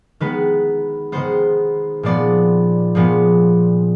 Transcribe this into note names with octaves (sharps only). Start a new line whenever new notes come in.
D#3 G#3 B3 B4
D#3 G#3 B3 C5
A#2 F3 G#3 B3 D5
A#2 F3 G#3 B3